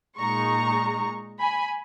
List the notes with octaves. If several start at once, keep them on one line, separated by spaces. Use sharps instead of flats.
A#2 G#3 D#4 A#5 C#6
G#5 B5